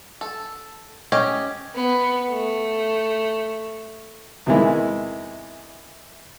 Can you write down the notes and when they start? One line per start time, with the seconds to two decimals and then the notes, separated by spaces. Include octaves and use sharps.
0.21 A4
1.12 C#4 G4 D#5 G5
1.75 B3
2.30 A3
4.46 E2 C3 D#3 E3 G#3 E4